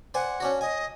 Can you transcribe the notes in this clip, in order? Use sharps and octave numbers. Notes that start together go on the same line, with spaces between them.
C5 D5 F#5 G#5
C#4 D4 F#4
D#5 G#5